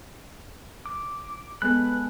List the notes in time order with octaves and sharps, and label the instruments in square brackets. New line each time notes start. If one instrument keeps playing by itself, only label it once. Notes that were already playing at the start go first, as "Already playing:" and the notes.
[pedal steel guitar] D6
[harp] G#3 B3 A4 [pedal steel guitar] B4 B5 F#6